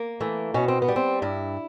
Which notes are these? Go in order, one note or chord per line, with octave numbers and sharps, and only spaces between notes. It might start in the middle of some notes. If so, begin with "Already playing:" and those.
Already playing: A#3
E3 A3
B2 C#4
C4
B3
G3
C4
G2 E4